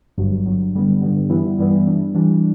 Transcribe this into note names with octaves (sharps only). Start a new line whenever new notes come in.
G1 G2 F#3
G1 G2 F#3
G2 D3 G3 B3
G2 D3 G3 B3
G2 E3 G3 B3 E4
G2 E3 G3 B3 E4
E3 G3 D4
E3 G3 D4